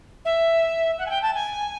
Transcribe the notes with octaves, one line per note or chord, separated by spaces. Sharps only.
E5
F#5
G#5
G5
A5
G#5